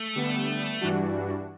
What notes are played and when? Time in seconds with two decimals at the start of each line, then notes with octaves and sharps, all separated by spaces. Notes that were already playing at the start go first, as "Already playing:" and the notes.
Already playing: A3
0.15 D3 G3 B3
0.81 G2 E3 G3 D4 F#4